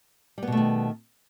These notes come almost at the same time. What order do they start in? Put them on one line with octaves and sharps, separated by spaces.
G3 B3 B2 A3 D#3